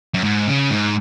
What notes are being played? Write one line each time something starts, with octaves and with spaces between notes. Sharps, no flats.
F#2
G#2
C#3
G#2